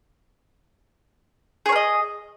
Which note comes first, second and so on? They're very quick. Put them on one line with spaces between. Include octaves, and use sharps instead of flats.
G#4 C#5 A#4 D#5